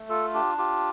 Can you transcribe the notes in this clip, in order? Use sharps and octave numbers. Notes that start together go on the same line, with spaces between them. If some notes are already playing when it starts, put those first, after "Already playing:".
Already playing: A3
F4 A4
D4 G4
F4 G4